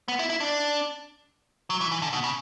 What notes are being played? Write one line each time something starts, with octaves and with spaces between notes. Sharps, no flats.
B3
E4
E4
D4
F#3
E3
E3
D3
B2
C#3